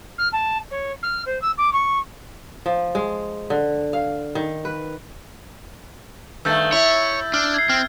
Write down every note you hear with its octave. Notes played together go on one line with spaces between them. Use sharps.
F6
A5
C#5
F6
C5
E6
D6
C#6
F3
G#3
D3
F5
D#3
B4
G2 D#3 A3 E6 G6 A6
E4 C#5
D4 F6
G#6 C7
C4 F6